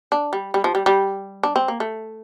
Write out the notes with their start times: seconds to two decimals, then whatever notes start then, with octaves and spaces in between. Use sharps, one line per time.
0.12 D4
0.33 G3
0.54 G3
0.64 F3
0.75 G3
0.86 G3
1.43 D4
1.56 C4
1.68 A#3
1.80 A3